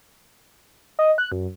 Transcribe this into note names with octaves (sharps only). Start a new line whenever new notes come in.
D#5
F#6
F#2